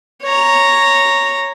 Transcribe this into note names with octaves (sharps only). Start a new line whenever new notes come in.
C#5 A#5